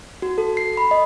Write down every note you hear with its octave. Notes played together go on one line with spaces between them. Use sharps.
F#4
A4
C7
B5
D#5